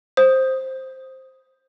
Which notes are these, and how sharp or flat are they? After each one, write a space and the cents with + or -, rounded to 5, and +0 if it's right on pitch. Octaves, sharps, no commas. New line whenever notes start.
C5 +5 D#6 +0